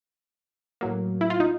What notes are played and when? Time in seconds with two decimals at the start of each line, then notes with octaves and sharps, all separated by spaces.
0.81 A2 F#3 A#3
1.21 E4
1.30 F4
1.40 D#4